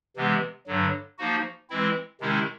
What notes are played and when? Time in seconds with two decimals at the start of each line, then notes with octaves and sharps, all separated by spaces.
0.16 C3 E3 G#3 B3
0.67 G2 D3 F#3
1.18 F3 A#3 D#4 F#4
1.70 E3 G#3 C4 E4
2.21 C3 D#3 G#3 C#4 E4